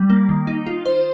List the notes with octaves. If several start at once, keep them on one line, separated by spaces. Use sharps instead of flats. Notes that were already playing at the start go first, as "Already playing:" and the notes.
Already playing: G3
A#3
D#3
D#4
F4
C5